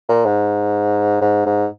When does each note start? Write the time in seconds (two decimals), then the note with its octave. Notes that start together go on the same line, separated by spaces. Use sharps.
0.09 A#2
0.25 G#2
1.21 G#2
1.46 G#2